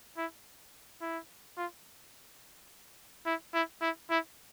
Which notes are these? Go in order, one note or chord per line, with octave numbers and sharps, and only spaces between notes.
E4
E4
F4
E4
E4
E4
E4